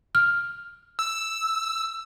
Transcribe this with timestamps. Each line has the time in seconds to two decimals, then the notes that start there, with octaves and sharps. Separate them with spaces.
0.15 F6
0.99 E6